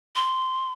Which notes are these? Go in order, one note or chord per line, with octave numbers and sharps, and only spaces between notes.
C6